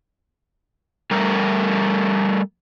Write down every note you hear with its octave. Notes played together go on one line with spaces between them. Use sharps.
G3 A3 A#4